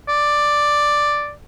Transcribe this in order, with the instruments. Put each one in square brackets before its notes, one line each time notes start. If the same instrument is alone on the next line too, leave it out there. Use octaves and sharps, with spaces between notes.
[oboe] D5